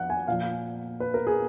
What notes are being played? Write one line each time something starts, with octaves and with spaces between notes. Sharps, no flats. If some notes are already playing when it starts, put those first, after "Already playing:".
Already playing: F2 F#5
G#5
A#2 F3 F5
B4
A#4
G#4